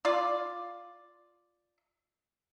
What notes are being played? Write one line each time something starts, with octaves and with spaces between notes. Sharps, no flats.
F4 D5